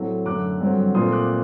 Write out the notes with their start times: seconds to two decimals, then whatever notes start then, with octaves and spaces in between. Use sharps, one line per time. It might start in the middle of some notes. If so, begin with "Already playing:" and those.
Already playing: A2 F#3 A3 C4
0.26 F#2 D3 A3 D6 F#6
0.61 G2 D3 F#3 C4
0.95 A#2 A3 C4 C6 D#6
1.12 D6 F#6